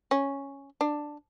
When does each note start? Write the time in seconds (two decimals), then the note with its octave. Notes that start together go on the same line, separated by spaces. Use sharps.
0.11 C#4
0.81 D4